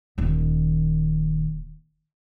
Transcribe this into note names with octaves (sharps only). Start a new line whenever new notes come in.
D#1 D#3